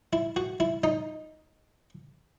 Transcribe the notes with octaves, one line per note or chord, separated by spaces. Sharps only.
E4
F#4
E4
D#4